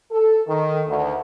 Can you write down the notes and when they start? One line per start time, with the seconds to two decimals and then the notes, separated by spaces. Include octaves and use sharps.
0.12 A4
0.48 D#3
0.88 D2